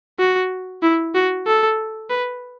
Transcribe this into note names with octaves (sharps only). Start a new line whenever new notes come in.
F#4
E4
F#4
A4
B4